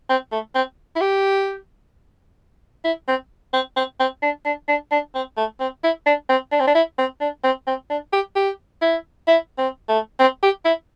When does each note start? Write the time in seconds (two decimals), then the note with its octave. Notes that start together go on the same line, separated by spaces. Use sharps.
0.10 C4
0.32 A3
0.55 C4
0.96 E4
1.01 G4
2.85 E4
3.08 C4
3.53 C4
3.76 C4
4.00 C4
4.22 D4
4.45 D4
4.68 D4
4.92 D4
5.15 C4
5.37 A3
5.60 C4
5.84 E4
6.06 D4
6.29 C4
6.52 D4
6.60 C4
6.67 D4
6.75 E4
6.98 C4
7.21 D4
7.44 C4
7.67 C4
7.90 D4
8.13 G4
8.36 G4
8.82 E4
9.28 E4
9.58 C4
9.89 A3
10.20 C4
10.43 G4
10.65 E4